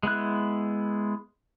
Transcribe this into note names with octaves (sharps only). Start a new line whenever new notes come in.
G#3 B3 E4 F#6